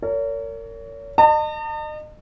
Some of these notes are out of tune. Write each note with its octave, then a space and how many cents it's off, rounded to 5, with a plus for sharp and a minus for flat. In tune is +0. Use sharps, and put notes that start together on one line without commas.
A#4 -30 C#5 +35
D#5 -35 A5 +45